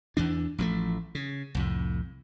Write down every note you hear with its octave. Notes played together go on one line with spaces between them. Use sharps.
E2 E3 D4
A1 F3 F#3 A3
C#3
C2 F2 A2